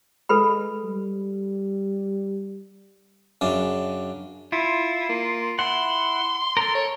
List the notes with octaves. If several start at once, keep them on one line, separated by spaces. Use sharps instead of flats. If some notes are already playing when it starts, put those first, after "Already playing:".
G#3 A4 B4 B5
G3
F#2 C#3 D4
E4 F4
A#3
E4 F#5 C6
A4 A#4
C#5